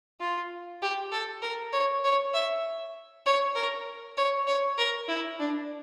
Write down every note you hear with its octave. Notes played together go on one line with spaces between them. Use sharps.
F4
G4
A4
A#4
C#5
C#5
E5
C#5
A#4
C#5
C#5
A#4
E4
D4